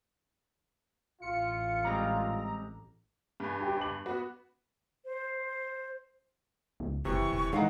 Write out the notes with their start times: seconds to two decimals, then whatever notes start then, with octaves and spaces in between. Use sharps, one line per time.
1.22 A1 F4 C#7
1.85 G3 G#3 C4 A#5
3.40 G2 G#5
3.61 G4 G5
3.77 D6 F#7
4.06 B3 F#4
5.05 C5
6.80 C#2
7.05 F#1 C3 E3 C#6
7.30 E1
7.53 D#3 E3 G#3 D#4 F5 F#5 A#5